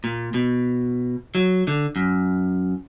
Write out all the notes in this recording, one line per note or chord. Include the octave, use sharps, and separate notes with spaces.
A#2
B2
F#3
D3
F#2